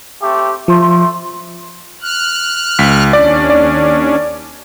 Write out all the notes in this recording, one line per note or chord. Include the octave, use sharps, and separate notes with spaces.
A3 C4 G4
F3 A3 C6
F6 F#6
C#2 B6
D#2 C#4 D4 D5
D5